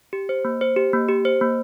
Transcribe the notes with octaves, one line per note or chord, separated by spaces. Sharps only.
G4
C5
A#3
C5
G4
A#3
G4
C5
A#3